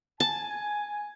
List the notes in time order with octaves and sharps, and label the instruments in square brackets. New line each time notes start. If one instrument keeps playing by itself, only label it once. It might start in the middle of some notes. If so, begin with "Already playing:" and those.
[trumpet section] G#5 [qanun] A5